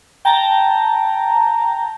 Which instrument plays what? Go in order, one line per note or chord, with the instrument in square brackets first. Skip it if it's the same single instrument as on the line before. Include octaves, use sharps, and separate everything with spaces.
[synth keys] G5 A5 A#5